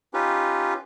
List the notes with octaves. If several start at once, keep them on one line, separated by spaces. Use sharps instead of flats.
C#4 D#4 F4 G4 B4